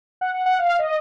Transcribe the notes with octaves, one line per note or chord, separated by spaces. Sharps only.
F#5
F#5
F#5
F5
D#5